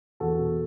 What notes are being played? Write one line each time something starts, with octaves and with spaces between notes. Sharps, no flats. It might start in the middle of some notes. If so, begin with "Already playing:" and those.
E2 F#4 A4
B2